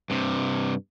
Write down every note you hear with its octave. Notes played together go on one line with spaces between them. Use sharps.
G2 C3